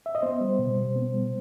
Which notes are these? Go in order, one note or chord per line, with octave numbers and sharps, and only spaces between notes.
E5
D#5
B3 C5
G3
B2
B2
B3
G3